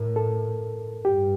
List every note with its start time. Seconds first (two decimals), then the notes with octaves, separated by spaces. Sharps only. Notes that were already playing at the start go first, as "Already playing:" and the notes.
Already playing: A2 A#4
0.16 A4
1.05 G2 G4